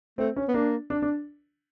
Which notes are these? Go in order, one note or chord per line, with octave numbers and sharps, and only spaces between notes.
A3 C4
C#4
B3
A#3 D4
D4
D4